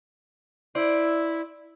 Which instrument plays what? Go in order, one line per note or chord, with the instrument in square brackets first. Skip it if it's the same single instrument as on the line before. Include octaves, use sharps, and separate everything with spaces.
[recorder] E4 [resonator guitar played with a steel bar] C5 D5